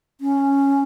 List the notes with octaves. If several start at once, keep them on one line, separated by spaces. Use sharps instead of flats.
C#4